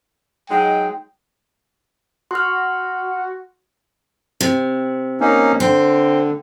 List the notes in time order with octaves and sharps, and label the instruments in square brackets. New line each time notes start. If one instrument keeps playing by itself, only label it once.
[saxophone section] F#3 G#3 D#4 [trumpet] G5
[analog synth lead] F#4 [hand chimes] C6 F6
[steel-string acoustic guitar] C3
[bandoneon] A#3 C#4 D#4
[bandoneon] D3 [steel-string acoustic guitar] C4